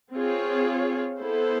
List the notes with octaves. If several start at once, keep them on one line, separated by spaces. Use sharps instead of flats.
C4 F4 G#4 C#5
B3 E4 A4 C5